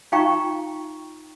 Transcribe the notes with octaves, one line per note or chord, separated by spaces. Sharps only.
D#4 F4 F5 G5 A#5 C#6